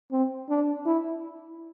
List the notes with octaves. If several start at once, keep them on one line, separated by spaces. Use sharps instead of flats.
C4
D4
E4